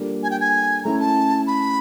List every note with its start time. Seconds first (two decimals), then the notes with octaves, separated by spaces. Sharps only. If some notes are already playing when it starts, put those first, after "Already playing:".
Already playing: G3 A#3 D4 F4 A4
0.23 G#5
0.30 G5
0.40 G#5
0.84 A3 C#4 E4 A#5
1.00 A5
1.47 B5